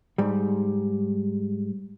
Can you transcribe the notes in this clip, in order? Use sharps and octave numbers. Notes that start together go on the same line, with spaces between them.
G#2 G3